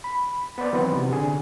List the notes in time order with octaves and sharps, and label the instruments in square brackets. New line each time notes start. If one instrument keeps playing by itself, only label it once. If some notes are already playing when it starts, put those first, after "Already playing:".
[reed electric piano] B5
B3 B4 C5 D5
D#3 E3 F#3 B3 C4
C3
D3 G#4